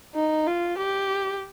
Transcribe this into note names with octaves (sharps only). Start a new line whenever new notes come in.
D#4
F4
G4